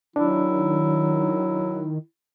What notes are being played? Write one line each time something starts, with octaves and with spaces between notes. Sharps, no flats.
D#3 F#3 D4 E4